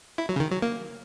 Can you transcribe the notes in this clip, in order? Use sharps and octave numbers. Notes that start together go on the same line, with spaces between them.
E4
F#3
C#3
D#3
F#3
A#3